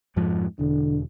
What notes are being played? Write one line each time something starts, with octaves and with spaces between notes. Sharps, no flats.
F2 G#2 F3
E1 D3